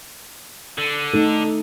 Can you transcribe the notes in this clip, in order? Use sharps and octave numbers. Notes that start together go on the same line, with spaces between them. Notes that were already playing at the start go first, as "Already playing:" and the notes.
D3
A3 D#4 A4